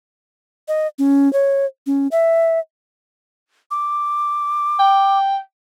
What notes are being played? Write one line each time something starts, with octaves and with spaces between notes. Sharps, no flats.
D#5
C#4
C#5
C#4
E5
D6
G5